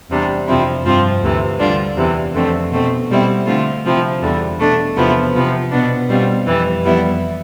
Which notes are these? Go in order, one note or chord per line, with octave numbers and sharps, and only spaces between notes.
E2 C3 G3 D4
F2 C3 F3 C4 E4
G2 F3 C4 F4
D2 C3 E3
D3 G3 D4 F4
E2 C3 E3
F2 D3 A3 C4
B2 A3 C4
B2 G3 C4 E4
D3 A3 C4 F4
C3 F3 C4 E4
E2 D3 G3
B2 A3 D4
E2 C3 F3 B3 E4
C3 F3 B3
B2 B3 D4
B2 G3 C4 F4
F2 E3 G3
F2 E3 G3 B3 E4